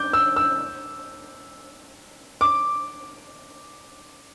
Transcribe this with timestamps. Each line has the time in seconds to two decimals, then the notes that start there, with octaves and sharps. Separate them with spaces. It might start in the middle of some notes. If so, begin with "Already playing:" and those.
Already playing: D6 G6
0.13 E6
0.36 E6
2.41 D6